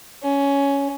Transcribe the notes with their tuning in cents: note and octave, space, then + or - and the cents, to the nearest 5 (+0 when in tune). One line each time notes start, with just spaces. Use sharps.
C#4 +10